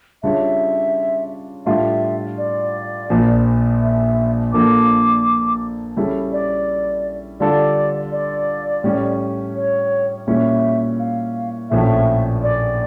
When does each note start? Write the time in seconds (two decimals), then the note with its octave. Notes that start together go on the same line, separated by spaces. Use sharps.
0.23 C#3 G3 D4 F4 C#5 E5
1.66 A2 G3 D4 F4 E5
2.38 D5
3.10 A#1 A#2 F3
3.81 E5
4.53 A#2 F3 A#3 D4 A4 D6
5.96 C#3 G3 C#4 E4 A4
6.32 D5
7.40 D3 G3 D4 F4 A4 D5
8.12 D5
8.84 A2 G3 C#4
9.56 C#5
10.27 A#2 G3 C#4 E4 E5
10.99 F5
11.70 A#1 A2 F3 A3 C#4 E5
12.43 D5